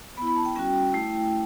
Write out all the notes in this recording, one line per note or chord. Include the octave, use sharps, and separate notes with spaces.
B3 E4 B5
B5
A5
G5
G3 C#4 F#4 G5
A3 E4